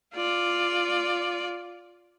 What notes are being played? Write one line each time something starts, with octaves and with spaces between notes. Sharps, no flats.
F4 D5